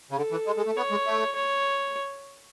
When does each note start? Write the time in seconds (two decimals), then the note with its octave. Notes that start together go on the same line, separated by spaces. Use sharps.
0.11 C#3
0.17 D3 A4
0.31 E3
0.47 G#3
0.57 G#3
0.66 A3
0.76 B3 C#5
0.91 G#3
1.06 A3
1.35 C#5